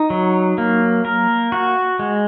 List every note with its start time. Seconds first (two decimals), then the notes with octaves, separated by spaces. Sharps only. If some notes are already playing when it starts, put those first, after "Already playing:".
Already playing: D#4
0.10 F#3
0.58 A#3
1.05 A#4
1.52 F#4
1.99 G#3